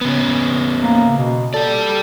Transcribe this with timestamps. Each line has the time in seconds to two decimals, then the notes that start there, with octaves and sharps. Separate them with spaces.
0.01 C#3 B3
0.81 A#3
1.17 B2
1.54 G4 A4 D5